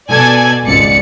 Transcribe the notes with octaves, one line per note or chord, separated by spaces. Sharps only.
B2 A4 D5 G#5 G#6
G#1 C#2 G#2 D5 C#7